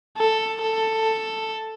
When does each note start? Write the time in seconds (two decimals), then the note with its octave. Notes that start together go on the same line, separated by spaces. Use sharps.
0.18 A4
0.61 A4